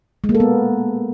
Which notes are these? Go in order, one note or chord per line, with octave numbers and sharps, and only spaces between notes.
G#3
A#3
A4
B3